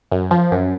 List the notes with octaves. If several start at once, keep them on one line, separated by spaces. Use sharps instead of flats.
F#2
F3
F#2